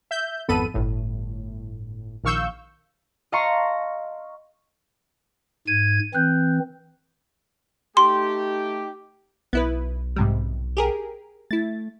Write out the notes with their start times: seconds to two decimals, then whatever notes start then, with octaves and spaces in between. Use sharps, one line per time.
0.11 E5 G6
0.48 G#1 F2 B3 A4 B5 D#7
0.74 G1 A2
2.24 A#1 D#3 F5 C#6 E6 G6
3.32 D#5 F5 A5 A#5 C6 C#6
5.67 G#2 G#6 D#7
6.14 E3 C4 F#6 G6
7.97 A3 D#4 G4 C6
9.53 B1 B3 E4 B4
10.16 G#2 C3 G3
10.77 G4 G#4 A#4
11.51 A3 E4 A6